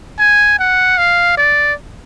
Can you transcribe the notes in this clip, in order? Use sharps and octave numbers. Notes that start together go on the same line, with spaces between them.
G#5
F#5
F5
D5